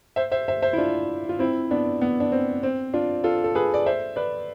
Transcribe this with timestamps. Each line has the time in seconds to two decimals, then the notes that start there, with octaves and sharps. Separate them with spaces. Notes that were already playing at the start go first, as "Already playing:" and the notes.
0.16 C5 E5
0.32 C5 E5
0.48 C5 E5
0.62 C5 E5
0.73 E4
0.78 D4 F4
1.29 F4
1.39 C4 E4
1.71 B3 D4
2.01 B3
2.20 D4
2.32 C4
2.63 C4
2.94 D4 F4
3.24 F4 A4
3.44 A4
3.55 G#4 B4
3.74 D5
3.86 C5 E5
4.16 B4 D5